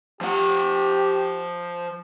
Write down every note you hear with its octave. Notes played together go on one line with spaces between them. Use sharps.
F3 G4 F#5